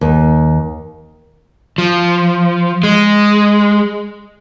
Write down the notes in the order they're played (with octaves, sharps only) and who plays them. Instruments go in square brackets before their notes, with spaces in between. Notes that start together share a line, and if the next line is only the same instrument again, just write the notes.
[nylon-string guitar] D#2
[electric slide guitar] F3
G#3